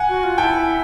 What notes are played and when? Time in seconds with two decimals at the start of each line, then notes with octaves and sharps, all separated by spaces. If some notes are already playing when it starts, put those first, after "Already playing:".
Already playing: F#5 G#5
0.09 F#4
0.23 F4
0.38 E4 G5 A5